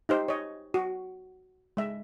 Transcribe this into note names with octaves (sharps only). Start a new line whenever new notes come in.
D#4 G4 C5
C#5 D#5
F#4
G#3 E5